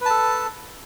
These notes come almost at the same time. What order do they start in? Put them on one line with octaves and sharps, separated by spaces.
B4 A5 A4